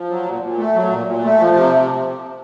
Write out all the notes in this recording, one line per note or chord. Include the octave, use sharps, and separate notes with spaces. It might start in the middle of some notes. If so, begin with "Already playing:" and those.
Already playing: F3
F#3
A#2
A#2
A3
F#3
A#2
A#2
A3
F3
C3